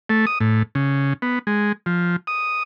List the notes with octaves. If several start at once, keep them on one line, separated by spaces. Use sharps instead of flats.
A3
D#6
A2
C#3
B3
G#3
F3
D#6